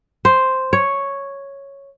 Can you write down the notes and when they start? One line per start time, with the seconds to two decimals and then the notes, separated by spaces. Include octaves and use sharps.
0.25 C5
0.73 C#5